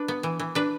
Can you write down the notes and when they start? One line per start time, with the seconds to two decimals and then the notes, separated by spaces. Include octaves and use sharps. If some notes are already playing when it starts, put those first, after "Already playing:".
Already playing: D4 B4
0.08 B3
0.23 E3
0.39 E3
0.55 D4 B4